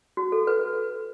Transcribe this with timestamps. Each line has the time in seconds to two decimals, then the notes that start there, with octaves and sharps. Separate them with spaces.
0.17 F#4
0.32 A4
0.47 B4